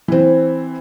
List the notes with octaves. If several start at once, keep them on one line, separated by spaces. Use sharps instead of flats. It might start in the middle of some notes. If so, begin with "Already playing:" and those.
E3 C4